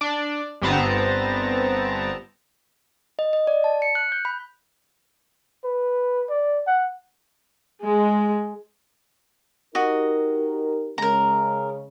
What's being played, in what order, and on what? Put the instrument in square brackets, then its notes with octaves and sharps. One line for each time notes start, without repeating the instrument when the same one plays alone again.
[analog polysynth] D4 D5
G1 G2 B3 C4 A5 A#5
[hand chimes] D#5
D#5
D5
A5
C#7
F#6
G6
B5
[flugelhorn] B4
D5
F#5
[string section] G#3
[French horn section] D#4 G4 A#4 [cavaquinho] F#4 D#5
[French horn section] C#3 G#3 [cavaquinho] A#4 A#5